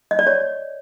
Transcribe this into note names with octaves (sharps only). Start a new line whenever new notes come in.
D#5
D5
C#5